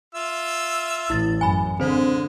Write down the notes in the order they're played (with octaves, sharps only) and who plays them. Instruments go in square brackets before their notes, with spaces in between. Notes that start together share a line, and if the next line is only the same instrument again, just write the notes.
[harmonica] F4 E5 E6
[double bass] A1 [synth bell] E4 A6
[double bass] F#2 [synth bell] G#5 B5
[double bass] D3 [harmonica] G#3 [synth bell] C4 C5